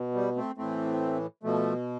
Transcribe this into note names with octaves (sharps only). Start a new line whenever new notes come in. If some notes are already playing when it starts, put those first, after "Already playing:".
Already playing: B2
G3
A3 C4
A2 E3 A3 C4
B2 F3 A3